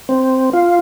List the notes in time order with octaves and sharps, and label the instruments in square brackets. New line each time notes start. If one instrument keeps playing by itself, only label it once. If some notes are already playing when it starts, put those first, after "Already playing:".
[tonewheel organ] C4
F4